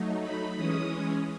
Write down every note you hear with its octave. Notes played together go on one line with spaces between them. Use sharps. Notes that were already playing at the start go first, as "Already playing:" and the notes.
Already playing: F#3 A3 D#4
B5
E3 G#3 C#4 D#6